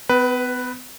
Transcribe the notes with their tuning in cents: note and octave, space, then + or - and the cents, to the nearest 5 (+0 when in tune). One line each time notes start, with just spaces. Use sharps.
B3 +40 B4 +0